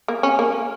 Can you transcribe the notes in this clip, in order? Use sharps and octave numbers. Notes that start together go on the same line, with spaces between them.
A#3
C#4
A#3